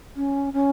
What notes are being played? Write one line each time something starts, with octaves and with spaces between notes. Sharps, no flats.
C#4
C#4